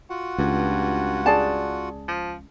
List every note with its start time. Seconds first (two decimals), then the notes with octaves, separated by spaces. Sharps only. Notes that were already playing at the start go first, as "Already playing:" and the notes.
0.10 F4 F#4 F#5
0.38 C#2 G2
1.26 G#4 D5 A5
2.08 F3